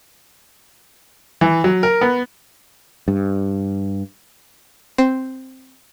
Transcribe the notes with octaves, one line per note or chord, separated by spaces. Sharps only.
E3
F#3
A#4
B3
G2
C4